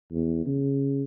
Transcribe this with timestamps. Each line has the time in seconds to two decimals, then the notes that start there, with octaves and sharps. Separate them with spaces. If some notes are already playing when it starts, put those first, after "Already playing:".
0.12 E2
0.46 C#3